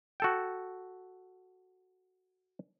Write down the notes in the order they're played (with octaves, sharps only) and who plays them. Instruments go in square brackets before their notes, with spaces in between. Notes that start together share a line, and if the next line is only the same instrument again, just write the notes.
[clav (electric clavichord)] F#4 A4 G5